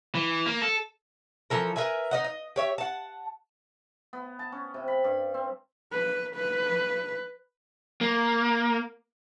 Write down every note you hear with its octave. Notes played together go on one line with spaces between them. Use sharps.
E3
A#3
A4
E3 F3 A4 A#4
A#4 B4 E5 G#5
D#4 D#5 F#5
D#5
G4 C#5 E5
F#5 A5
B3
A5
C#4
C3
B5
G2
C4
B4
B4
A#3